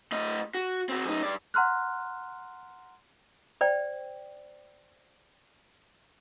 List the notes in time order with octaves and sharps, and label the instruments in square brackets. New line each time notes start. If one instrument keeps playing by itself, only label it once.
[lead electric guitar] A2 D#5
F#4
C4 F#4
F#2 D#4
G2 D5
[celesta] F#5 A#5 C6 F6 F#6
[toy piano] C5 D5 G5